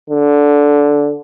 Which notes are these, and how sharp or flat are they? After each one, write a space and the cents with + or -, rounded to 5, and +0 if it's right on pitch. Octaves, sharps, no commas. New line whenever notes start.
D3 -10